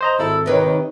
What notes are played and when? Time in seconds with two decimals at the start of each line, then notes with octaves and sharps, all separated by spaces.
0.01 C5 D#5 A#5
0.19 G#1 E4 A4
0.46 C3 D#3 D#4 B4 C#5